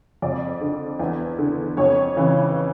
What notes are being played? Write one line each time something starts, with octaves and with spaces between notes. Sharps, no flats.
F2 D5
D3
E2
D3
F2 C#5
C#3 E3